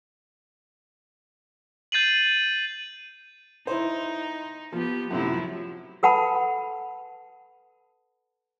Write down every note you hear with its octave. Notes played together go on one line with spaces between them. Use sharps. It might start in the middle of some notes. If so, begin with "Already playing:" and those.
G6 A6 C7 D#7 F#7
D#4 E4 C5
F3 B3 F4 G4
F#2 A2 C3 F3 F#3 E4
A4 B4 F#5 A5 B5